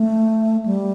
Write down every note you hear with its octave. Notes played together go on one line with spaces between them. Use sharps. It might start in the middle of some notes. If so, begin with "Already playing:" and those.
Already playing: A3
G3